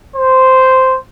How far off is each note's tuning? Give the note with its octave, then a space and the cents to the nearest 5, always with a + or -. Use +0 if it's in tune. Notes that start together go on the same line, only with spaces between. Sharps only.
C5 -10